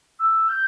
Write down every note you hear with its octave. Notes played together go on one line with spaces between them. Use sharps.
E6
G6